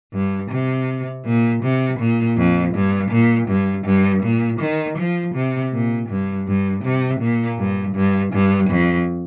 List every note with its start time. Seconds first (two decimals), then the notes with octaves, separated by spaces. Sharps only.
0.14 G2
0.51 C3
1.25 A#2
1.63 C3
1.99 A#2
2.37 F2
2.75 G2
3.11 A#2
3.48 G2
3.85 G2
4.23 A#2
4.60 D#3
4.98 F3
5.34 C3
5.73 A#2
6.09 G2
6.47 G2
6.84 C3
7.20 A#2
7.58 G2
7.96 G2
8.33 G2
8.70 F2